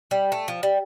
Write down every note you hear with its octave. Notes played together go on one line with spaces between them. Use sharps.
G3
A3
F3
G3